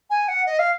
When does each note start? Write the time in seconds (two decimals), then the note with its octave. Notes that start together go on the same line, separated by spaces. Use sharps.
0.10 G#5
0.28 F#5
0.46 D#5
0.59 F5